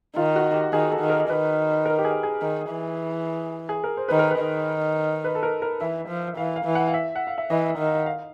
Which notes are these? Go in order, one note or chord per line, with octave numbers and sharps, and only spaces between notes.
D#3 F4
F#4
G4
D#3 G#4
A4
D#3
A#4
D#3 B4
A#4
G4
G#4
G#4
D#3
E3
G#4
A#4
C5
D#3 B4
A#4
B4
D#3
B4
A4
A#4
A#4
E3 E5
F3
E3 F5
F5
E3
F#5
F5
E5
F#5
F5
E5
E3 D#5
D#3
F5